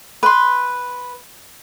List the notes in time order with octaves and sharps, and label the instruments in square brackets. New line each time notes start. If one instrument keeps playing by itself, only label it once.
[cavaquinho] B4 C6